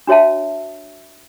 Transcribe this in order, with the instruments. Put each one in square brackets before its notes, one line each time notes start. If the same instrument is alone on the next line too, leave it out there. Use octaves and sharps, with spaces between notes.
[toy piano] D4 F#4 C#5 E5 A5